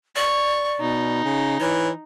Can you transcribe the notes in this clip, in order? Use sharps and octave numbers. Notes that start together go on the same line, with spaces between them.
D5 C#6
B2 D#4
C#3
E3 C#5